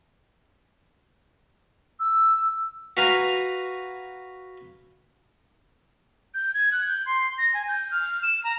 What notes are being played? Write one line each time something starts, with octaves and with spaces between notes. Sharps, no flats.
E6
F#4 B4 F5 G#5 A#5
G6
G#6
F#6
G6
C6
A#6
G#5
G6
F6
E7
A#5